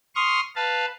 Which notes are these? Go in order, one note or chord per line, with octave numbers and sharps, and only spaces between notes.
C6 C#6 D#6 F6
B4 F5 A5